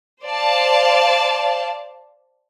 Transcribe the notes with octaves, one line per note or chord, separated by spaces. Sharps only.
C5 D5 F5 A5